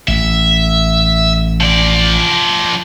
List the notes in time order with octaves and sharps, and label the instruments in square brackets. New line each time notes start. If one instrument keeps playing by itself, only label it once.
[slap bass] A1 [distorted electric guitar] E5
[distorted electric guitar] F3 D5